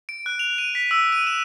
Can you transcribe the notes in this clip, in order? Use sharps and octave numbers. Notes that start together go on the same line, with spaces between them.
D7
F#6
F7
D#7
B6
E6
D#7
E7